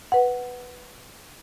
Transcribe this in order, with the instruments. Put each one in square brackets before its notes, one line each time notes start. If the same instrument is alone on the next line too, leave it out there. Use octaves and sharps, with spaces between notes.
[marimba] B4 F#5